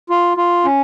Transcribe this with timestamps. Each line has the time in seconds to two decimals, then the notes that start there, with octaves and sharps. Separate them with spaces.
0.10 F4
0.37 F4
0.65 C#4